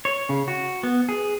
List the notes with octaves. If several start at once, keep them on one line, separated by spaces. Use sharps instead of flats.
C#5
C#3
F#4
B3
G#4